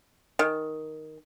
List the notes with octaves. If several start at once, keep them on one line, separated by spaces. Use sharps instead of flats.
D#3